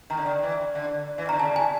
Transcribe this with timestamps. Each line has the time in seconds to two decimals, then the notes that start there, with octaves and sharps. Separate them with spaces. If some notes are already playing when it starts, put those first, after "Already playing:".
0.10 D#3 A#5
0.17 D3
0.26 D#3
0.43 E3
0.75 D3
1.18 E3
1.25 D#3
1.29 D3 A#5
1.39 C#3 A5
1.56 C3 G#5